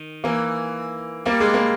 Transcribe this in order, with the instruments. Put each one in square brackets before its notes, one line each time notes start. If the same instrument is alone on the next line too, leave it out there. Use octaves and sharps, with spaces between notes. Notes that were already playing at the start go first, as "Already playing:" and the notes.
Already playing: [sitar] D#3
[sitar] E3 [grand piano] A#3
[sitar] G3 [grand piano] A#3
[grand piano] G#3
A#3